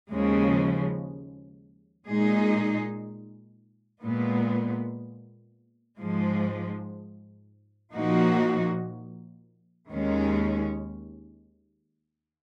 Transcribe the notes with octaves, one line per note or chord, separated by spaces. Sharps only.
D#2 C#3 F3 G#3
A#2 G#3 D#4 G#4
A#2 G#3 B3
G#2 F3 G#3
A#2 F3 A#3 D#4 F#4
D#2 D#3 G#3 C#4